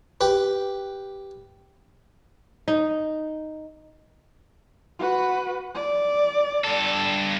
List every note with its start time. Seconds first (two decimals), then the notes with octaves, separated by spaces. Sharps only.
0.21 G4 B4
2.68 D#4
4.99 F#4 B4
5.75 D5
6.65 G2 A4